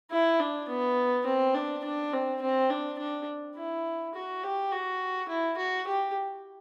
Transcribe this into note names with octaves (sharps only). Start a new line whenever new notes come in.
E4
D4
B3
C4
D4
D4
C4
C4
D4
D4
E4
F#4
G4
F#4
E4
F#4
G4